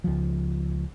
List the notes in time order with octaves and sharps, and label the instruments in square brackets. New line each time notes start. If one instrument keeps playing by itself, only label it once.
[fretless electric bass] C#2 F3